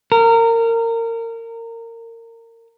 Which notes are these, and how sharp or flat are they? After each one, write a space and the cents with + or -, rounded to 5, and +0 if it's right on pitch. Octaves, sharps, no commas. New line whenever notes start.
A#4 -25